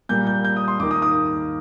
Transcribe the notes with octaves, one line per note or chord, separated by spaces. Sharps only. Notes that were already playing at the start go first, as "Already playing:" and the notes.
A#2 G3 A#3 G6
G6
G6
D#6
C6
D#2 D#3 A#3 D6
D#6
D#6